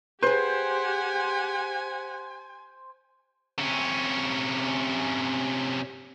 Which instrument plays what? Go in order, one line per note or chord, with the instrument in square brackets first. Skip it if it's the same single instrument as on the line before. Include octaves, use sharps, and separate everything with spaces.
[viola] G4 F#5 [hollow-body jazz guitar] G#4 B4 [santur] C5 [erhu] G#5
[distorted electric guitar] C3 C#4